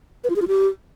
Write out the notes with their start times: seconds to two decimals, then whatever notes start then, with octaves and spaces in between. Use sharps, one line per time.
0.24 B4
0.30 F4
0.36 G#4
0.42 F4
0.48 G4